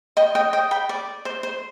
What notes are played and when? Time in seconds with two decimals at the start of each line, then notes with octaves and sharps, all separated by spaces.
0.17 D#5 G5
0.35 D#5 G5
0.53 D#5 G5
0.71 G5 B5
0.89 D5
1.25 C5
1.43 C5